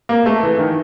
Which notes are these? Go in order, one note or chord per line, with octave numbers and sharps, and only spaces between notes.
A#3
A3
E3
D#3